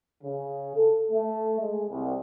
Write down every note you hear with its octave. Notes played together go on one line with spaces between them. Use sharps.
C#3
A4
A3
G#3
C2